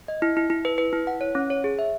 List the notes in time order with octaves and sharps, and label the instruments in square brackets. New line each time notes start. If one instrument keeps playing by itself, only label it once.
[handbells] D#5
E4
E4
E4
B4
B4
E4
F#5
C#5
C#4
C#5
G#4
E5